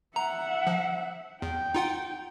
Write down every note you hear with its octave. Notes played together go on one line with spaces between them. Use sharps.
E5 F#5 A#5
F3
E2 G5
D#4 F4 F#5